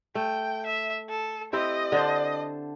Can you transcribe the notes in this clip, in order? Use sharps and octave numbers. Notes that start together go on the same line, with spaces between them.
A3 G5
E5
A4
C4 E4 G4 D#5
D3 D4 C5